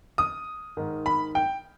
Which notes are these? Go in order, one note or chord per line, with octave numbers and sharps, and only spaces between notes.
D#6
G#2 D#3
B5
G5